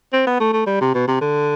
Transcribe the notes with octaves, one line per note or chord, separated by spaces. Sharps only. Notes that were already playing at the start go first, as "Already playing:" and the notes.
C4
B3
A3
A3
G3
C3
B2
C3
D3